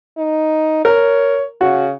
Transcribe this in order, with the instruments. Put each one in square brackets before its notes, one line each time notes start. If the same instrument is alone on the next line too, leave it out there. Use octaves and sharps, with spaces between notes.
[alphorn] D#4
[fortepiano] A#4 [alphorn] C#5
[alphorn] C#3 [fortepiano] F#4